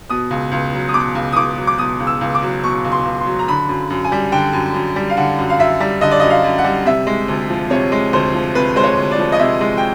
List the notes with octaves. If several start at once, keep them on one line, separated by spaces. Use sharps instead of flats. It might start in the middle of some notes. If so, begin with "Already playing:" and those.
B2 D#6
C#2
C#2
F#3
D#6
B2 D6
C#2
D#6
C#2 D6
F#3
D6
B2 D#6
C#2
E6
C#2
D6
F#3
B2 C#6
C#2
C6
C#2
C6
F#3
A#5
D3 B5
F#2
F#2
G#5
G3
D3 G5
F#2
F#2
G3
F5
D3 F#5
F#2
F5
F#2 E5
G3
D3 D#5
D5
F#2 D#5
F5
F#2
F#5
G3
C3 E5
G#3
D2
F3
C3 C#5
G#3
D2 C5
F3
C3 B4
G#3 C5
C#5
D2
D5
F3
D#5
C3 E5
G#3
G5